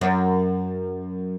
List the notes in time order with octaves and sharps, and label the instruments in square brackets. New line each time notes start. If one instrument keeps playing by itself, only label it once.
[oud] F#2